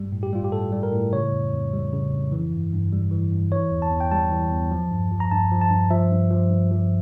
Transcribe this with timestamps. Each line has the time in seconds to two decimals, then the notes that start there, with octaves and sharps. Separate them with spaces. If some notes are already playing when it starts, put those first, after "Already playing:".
Already playing: G2 G3
0.12 A2
0.23 G4
0.33 G3 F4
0.44 G4
0.52 A2 A4
0.72 G3
0.83 A#4
0.92 A2
1.13 C#3 C#5
1.32 F2
1.53 F2
1.73 G3
1.93 C#3
2.12 F2
2.32 E3
2.51 G2
2.73 G2
2.92 G3
3.11 E3
3.32 G2
3.52 E3 C#5
3.71 E2
3.82 A5
3.91 E2
4.00 G5
4.12 G3 A5
4.32 E3
4.52 E2
4.71 F3
4.91 G2
5.12 F3
5.20 A#5
5.31 G2 A5
5.52 F3
5.61 A5
5.70 G2
5.91 F3 E5
6.11 G2
6.31 F3
6.50 G2
6.71 F3